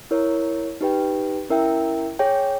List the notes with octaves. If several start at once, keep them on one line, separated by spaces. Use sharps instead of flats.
E4 A#4 C#5
D#4 G4 B4 G5
C#4 E4 A#4 E5 G5
G#4 C#5 G5